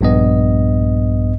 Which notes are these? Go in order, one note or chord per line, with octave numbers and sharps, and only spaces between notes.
A#1 G2 B3 D#5